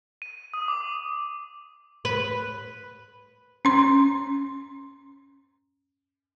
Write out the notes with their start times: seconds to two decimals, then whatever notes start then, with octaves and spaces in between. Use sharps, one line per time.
0.22 D#7
0.54 D#6
0.68 D6
2.05 B4
3.65 C#4 C6